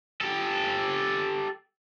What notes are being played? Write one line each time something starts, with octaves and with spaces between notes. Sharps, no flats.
G4 A4